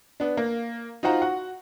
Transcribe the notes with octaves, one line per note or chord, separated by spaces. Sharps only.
B3 D4
A#3
D#4 F4 F#4 C5 F#5 A#5
F#4 F#5